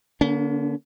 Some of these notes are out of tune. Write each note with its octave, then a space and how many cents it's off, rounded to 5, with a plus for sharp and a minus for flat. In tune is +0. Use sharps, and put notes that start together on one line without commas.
D3 -5 A#3 +20 C#4 +40